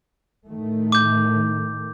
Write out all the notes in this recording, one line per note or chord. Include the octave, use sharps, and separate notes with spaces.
A2 D#3 A3
D6 G6